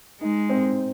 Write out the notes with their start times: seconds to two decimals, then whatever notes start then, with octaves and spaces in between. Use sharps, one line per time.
0.21 G#3 D#4
0.50 C4